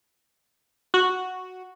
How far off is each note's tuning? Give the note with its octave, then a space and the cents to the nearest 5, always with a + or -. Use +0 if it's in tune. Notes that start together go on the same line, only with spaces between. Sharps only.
F#4 -5